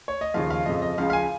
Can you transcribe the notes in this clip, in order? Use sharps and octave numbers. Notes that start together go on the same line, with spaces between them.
C#5
D#5
D#2 C#3 F3 F5
F5
F2 C#3 F3 D#5
D#5
C#2 C#3 F3 F5
F5
G#5